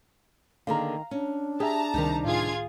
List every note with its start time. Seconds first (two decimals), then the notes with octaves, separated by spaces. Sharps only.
0.67 D3 D#3 A#3 G#4 F5 A#5
1.11 C#4 D4
1.60 G4 G#4 E5 A5 A#5
1.94 C#2 C3 D#3 G3 D#4
2.25 A2 F4 G#4 G#6